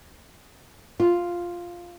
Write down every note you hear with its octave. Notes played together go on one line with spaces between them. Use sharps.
F4